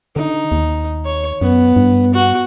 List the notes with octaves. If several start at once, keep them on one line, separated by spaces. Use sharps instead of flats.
D3 D#4
D#2
C#5
F#2 B3
G2
F#4